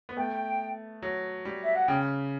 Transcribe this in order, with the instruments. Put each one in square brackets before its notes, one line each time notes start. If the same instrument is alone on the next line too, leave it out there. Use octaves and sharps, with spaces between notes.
[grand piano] B3
[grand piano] A3 [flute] G5
[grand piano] F#3
G3
[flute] E5
F#5
[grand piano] C#3 [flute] G5